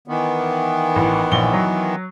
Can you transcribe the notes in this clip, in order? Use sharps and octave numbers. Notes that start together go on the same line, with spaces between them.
D#3 E3 B3
A1
A#1 G7
F#3